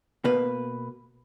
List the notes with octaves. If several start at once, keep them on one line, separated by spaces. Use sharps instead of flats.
B2 A#3 B4